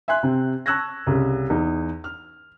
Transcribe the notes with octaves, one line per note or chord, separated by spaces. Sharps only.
E5 G#5 C6 F#6
C3 C4
A5 C#6 E6 F#6 G#6 A#6
C2 C#3
E2 D#4
F6